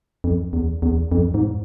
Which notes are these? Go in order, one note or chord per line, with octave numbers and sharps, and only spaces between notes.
F2
E2
E2
F2
G#2